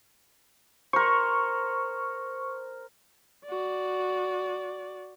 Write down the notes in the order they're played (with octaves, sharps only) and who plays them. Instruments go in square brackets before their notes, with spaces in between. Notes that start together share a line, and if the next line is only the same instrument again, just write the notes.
[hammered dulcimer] A#4 C5 [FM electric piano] C#6
[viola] F#4 D5